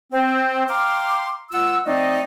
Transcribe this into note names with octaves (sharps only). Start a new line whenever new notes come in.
C4
F5 G5 A#5 C6 D6 F6
C#2 F4 F#5 E6
F3 A3 C4 D#4 D5 D#5